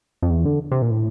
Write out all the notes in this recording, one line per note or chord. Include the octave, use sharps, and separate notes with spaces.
F2
E2
D3
C3
A#2
A2